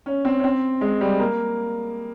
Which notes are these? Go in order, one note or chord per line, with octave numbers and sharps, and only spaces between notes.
C#4
C4
C#4
C4
G#3
G3
A#3